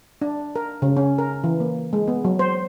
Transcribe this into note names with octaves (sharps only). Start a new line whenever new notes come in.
D4
A#4
C#3
C#4
A#4
E3
A#3
G#3
B3
F#3
C5